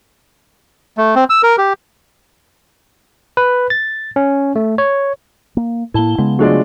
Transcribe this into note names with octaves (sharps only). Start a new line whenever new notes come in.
A3
C4
E6
A#4
G4
B4
A6
C#4
A3
C#5
A#3
A2 A#3 E4 A5 G7
C#3 G#3 B3
F#3 G#3 A3 D4 F4 D5